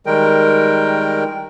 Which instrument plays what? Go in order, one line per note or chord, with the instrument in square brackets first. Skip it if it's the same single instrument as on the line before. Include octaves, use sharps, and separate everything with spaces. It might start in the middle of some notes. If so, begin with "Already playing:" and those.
[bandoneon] D#3 G3 G#3 A#4 G5